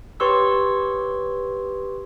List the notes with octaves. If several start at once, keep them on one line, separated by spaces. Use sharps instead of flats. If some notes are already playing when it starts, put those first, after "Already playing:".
G4 B4 C#5 C6 C#6 E6